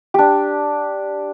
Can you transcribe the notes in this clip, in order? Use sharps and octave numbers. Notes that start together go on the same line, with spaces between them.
D4 G4